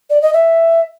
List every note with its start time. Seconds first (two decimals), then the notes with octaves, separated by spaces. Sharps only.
0.10 D5
0.22 D#5
0.34 E5